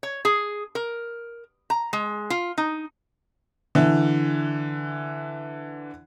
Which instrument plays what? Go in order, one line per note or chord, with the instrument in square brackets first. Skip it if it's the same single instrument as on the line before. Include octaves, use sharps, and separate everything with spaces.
[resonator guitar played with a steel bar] C#5
G#4
A#4
A#5
G#3
F4
D#4
[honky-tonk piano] D3 E3